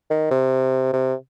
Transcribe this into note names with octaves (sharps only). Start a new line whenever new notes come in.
D#3
C3
C3